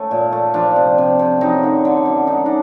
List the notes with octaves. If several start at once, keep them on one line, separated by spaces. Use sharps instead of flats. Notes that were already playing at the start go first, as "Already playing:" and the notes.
Already playing: A3 C#4
A#2
A3
F3 D4
C3
C3
C3
F#2 D#4
D3
D3
F#2
G#3 D#4
D4